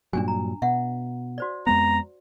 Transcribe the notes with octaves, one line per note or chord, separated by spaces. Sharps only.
G2 A#2 F#3 D4 G#5
A#5
B2 E5 F#5
F#4 C5 D5
F2 G#3 B3 A#5